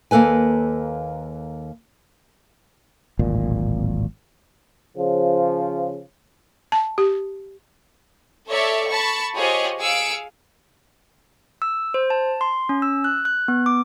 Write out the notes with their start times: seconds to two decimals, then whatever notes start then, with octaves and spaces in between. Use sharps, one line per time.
0.11 D#2 A#3 A4 B4 G#5
3.19 D1 G#1 A#2
4.97 C#3 F3
6.72 A5
6.98 G4
8.49 A4 C#5 D5 E5
8.89 A5 B5 C#6
9.36 F4 G4 G#4 C5 C#5 D#5
9.80 G#4 F5 E6 C#7 D7
11.62 E6
11.94 C5
12.10 A5
12.41 C6
12.69 C#4
12.82 E6
13.04 F#6
13.25 F#6
13.48 B3
13.66 D6